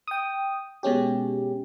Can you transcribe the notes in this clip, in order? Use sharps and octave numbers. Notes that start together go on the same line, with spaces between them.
G5 D#6
B2 G#3 C#4 G4